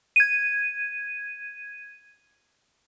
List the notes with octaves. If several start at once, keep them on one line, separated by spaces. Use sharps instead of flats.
G#6 D#7